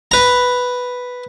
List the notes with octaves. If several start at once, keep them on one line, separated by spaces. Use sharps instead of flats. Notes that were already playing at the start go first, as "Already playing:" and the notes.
B4 A#5